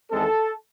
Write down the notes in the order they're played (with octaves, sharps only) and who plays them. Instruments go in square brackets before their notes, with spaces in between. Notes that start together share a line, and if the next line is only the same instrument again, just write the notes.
[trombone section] E2 D#3 G#3 C4 A4